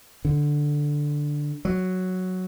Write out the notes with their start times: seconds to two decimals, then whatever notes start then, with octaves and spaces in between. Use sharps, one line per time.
0.25 D3
1.65 F#3